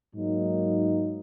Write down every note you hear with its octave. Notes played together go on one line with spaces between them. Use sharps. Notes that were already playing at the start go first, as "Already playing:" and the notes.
G#2 F#3 A#3 D#4